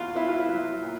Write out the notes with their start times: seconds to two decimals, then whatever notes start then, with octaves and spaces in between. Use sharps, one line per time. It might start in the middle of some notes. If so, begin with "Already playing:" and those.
Already playing: E2 B2 F4 F#4
0.15 B3 E4
0.28 F4
0.40 E4
0.49 F#3
0.82 A#2